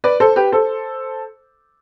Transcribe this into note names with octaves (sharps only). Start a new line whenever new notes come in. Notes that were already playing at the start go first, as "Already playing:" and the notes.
B4 D5
A4 C5
G4 B4
A4 C5